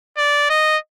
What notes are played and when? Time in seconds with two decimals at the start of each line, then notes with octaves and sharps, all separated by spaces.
0.18 D5
0.50 D#5